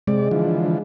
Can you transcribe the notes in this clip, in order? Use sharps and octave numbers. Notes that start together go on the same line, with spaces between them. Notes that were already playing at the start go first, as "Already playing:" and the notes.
C3 G#3 D5
D3 E3 F3